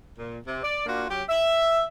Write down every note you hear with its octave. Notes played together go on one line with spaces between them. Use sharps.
A#2
C3
D5
A#3 D4 F4 F#4
F#3 C#4 G4
E5